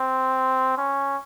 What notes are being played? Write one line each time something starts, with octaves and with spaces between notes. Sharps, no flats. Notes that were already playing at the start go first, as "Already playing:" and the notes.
Already playing: C4
C#4